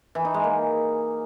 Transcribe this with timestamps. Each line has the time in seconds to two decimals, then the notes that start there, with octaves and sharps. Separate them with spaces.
0.15 E3
0.25 D#4
0.34 G#3
0.44 A#3